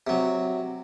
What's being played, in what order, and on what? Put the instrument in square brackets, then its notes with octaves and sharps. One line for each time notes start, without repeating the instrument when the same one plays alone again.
[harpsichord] C3 F#3